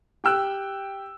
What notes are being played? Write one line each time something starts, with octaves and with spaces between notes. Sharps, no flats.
G4 G5 E6 F#6